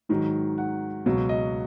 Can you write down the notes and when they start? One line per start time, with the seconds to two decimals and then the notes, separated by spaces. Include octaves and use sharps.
0.09 G#2 D#3 F#3
0.58 F#5
1.06 C#2 B2 F#3
1.29 D#5